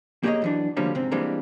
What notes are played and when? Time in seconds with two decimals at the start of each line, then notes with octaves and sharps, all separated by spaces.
0.23 A#3 G4 G#4 C5 C#5 D#5
0.42 F#2 E3 D4
0.77 D2 D3 F3 G3 A#3 C#4
0.95 G#2 C3 C4
1.11 E3 G3 G#3 A#3 C4 D4